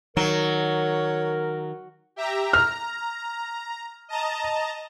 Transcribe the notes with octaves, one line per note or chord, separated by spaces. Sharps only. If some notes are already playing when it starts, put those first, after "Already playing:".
D#3 F#3 A#4 C#5
G4 E5 A#5
A#5 F6
D#5 A5 A#5